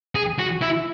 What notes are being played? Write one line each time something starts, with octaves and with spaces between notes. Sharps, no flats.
G#4
F#4
E4